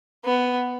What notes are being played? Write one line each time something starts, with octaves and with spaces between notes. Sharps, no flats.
B3